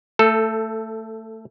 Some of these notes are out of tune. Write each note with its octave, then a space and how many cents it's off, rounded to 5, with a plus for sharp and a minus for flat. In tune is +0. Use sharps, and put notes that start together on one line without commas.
A3 +20 A4 +0